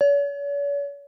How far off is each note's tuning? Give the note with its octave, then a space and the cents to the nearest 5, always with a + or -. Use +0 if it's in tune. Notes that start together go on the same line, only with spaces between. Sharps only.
C#5 +45